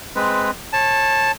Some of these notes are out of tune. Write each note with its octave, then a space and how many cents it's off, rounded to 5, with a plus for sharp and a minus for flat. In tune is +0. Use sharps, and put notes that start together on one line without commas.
G#3 +0 C4 +0 B4 +0
C#5 -30 A5 +0